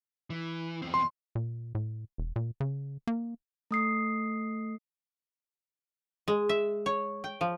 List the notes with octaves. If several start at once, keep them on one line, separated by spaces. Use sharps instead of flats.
E3
E2 C4
C6
A#2
A2
E1
A#2
C#3
A#3
A3 D#6 C7
G#3
E5
C#5
G5
F3